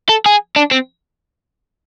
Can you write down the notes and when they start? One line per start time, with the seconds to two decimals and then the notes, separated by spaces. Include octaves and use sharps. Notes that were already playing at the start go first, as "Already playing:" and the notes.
0.09 A4
0.26 G#4
0.56 D4
0.71 C4